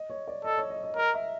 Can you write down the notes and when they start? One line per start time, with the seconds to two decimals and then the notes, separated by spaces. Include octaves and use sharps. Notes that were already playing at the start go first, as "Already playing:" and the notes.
Already playing: D#5
0.10 C#5
0.28 D5
0.45 A4 D#5
0.58 C#5
0.70 D#5
0.83 D#5
0.96 A#4 D#5
1.14 E5